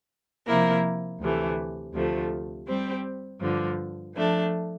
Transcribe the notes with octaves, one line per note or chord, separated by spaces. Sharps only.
C3 F3 A#3 E4 A#4
D2 C3 E3 A3
D2 C3 F3 A3
G3 C4 G4 C5
G2 D3 F3
F3 A3 D4